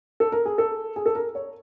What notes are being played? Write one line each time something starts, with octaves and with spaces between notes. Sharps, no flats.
A4
A#4
G#4
A4
G#4
A4
A#4
C#5